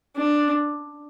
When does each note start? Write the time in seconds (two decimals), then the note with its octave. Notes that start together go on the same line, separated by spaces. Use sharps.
0.16 D4